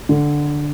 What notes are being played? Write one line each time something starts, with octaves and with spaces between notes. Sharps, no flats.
D3